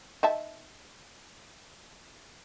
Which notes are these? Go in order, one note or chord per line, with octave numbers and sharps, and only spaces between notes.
D#4 E5 A5